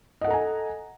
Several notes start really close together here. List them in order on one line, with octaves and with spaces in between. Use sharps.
D#5 F#5 A4 A#5 G#5